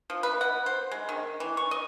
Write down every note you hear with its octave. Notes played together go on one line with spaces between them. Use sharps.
F3
B4
F#5
C5
G#3
D#3
E3
C#6
D#5